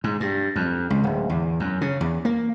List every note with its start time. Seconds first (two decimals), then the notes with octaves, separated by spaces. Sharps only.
0.04 G#2
0.20 G2
0.56 F2
0.90 C#2
1.04 D1
1.29 E2
1.60 F#2
1.81 C#3
2.01 E2
2.25 A#3